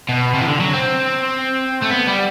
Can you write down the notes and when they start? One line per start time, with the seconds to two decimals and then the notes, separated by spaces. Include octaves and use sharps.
0.09 B2
0.34 C3
0.41 E3
0.48 D3
0.60 F#3
0.73 C4
1.82 A3
1.90 B3
2.07 G3